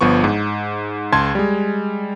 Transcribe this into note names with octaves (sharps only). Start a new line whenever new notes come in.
G1 F3 B3 C#6
G#2
C#2 A5 C6 G#6
G3 G#3